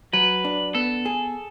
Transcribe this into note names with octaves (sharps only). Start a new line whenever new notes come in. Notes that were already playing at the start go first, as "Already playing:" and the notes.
F#3 B4
D4
B3 A4
G#4